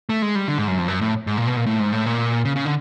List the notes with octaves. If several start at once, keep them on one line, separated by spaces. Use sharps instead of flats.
A3
G#3
G3
D3
G#2
F#2
F2
F#2
A2
G#2
A#2
B2
A#2
A2
G#2
A2
A#2
C#3
C#3
D3